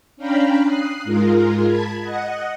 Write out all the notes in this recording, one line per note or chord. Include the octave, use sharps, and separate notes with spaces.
C#4 D4 F5 G5 A#5 B5
D#6 F#6 C7
G#2 G#3 F4 A#4
A5 B5 G#6
D#5 F#5